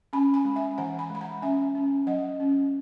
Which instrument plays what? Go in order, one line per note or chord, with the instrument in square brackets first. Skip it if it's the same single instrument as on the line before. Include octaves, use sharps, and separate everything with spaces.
[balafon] C#4 G#5 B5
G#5 B5
G#3
E5 G#5
E3 F#5 A#5
G#5 B5
G#3 B5
F#5 A#5
C#4 E5 G#5
C#4
F#3 D#5 F#5
C#4